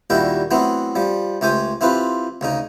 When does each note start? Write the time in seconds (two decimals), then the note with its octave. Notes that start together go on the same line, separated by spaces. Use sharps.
0.10 D#2 A#2 G3 E4 F#4 G5
0.51 E3 F#3 A3 B3 C4
0.95 F3 G3
1.41 C#2 A3 G4 C5 G#5
1.81 E3 C4 F4 G4 B4
2.41 D2 C#3 D#4